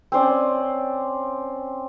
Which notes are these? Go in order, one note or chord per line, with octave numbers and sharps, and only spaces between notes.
C4 C#4 C5 D5